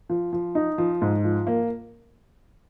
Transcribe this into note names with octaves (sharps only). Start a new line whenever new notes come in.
F3
F3
D#4
F3
G#2
F3
A#3